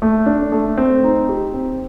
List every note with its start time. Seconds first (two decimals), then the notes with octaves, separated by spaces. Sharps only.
0.02 A3
0.26 D4
0.52 A3
0.78 C4
1.04 D#4
1.29 G4
1.54 C4